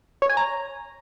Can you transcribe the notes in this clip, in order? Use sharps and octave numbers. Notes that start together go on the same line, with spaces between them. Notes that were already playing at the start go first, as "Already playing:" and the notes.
C#5
G#5
A#5